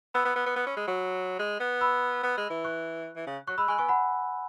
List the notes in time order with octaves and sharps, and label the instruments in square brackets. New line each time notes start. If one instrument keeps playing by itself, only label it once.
[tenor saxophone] B3 [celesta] B5 E6
[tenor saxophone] B3
B3
B3
B3
C#4
G#3
F#3
G#3
B3
[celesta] B5 E6
[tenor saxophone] B3
G#3
E3
[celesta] C#6 F#6
[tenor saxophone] E3
C#3
[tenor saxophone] F#3 [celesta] C#6 F#6
[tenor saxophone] G#3 [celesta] B5 E6
[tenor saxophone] G#3 [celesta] G#5 C#6
[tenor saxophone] B3 [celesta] G#5 C#6
[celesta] F#5 B5